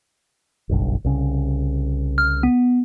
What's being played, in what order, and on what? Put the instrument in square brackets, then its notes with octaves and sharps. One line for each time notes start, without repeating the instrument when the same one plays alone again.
[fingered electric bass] F#1 B1 G2
C2 C#3
[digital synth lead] F6
B3